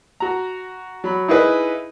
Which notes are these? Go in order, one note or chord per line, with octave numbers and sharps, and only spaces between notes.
F#4 A#5
F#3 B5
D#4 E4 G#4 B4 D#5